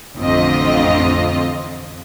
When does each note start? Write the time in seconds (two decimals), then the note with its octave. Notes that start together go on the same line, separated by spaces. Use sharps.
0.16 A1 F2 D3 C4 F4 D#5